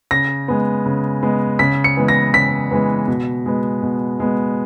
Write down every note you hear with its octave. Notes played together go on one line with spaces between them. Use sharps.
C#3 A#6
G#3 B3
C#3
G#3 B3
C#3 B6
C#7
E3 G#3 B3
A#6
C#3 B6
E3 G#3 B3
B2
G#3 B3
B2
G#3 B3